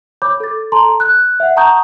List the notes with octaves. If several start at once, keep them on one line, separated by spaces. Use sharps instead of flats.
C#5 B5 D6 G6
A4 A6
A4 A5 A#5 C6
F#6
E5 F#5
F#5 A5 A#5 C#6 D#6 G6